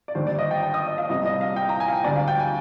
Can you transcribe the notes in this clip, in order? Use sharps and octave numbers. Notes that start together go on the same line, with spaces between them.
D5
D#2 D3 G3 C5
D5
D#5
G5
G5
D#6
D#5
F5
C2 C3 G3 D#5
D#5
F5
G5
A#5
G#5
F5
G5
D2 D3 G3 D5
F5
G5
G#5